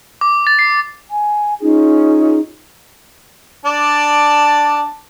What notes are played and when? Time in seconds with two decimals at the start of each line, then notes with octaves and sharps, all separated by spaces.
0.21 D6
0.47 A6
0.59 C7
1.10 G#5
1.60 C#4 D#4 F4 G#4
3.65 D4 D5 A5